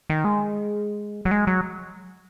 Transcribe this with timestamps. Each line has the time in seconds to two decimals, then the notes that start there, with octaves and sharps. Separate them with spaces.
0.10 D#3
0.24 G#3
1.25 F#3
1.31 G#3
1.47 F#3